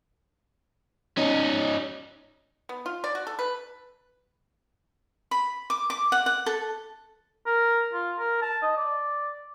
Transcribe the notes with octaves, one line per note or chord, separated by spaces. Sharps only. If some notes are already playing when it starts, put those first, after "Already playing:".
C#4 D#4
B3
F4
D5
F#4
A4
B4
B5
D6
D6
F#5
F#5
A4
A#4
F4
A#4
A5
D#5
D5